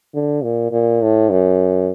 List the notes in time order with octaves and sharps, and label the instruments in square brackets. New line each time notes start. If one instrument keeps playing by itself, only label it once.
[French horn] D3
A#2
A#2
A2
F#2